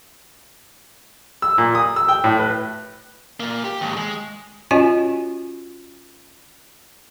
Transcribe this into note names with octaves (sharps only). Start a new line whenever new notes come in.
E6
A#2
D#6
E6
G5
A2
B4
A#2 A#3
G4
D#2 G#2
G#3
C#4 F4 F#4 C#5 D#5 G#5